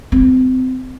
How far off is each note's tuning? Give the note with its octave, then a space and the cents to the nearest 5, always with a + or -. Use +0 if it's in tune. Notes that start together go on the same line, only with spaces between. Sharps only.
C4 -30